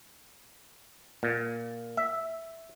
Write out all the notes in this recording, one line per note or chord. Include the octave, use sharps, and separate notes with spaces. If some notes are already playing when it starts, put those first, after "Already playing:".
A#2
E5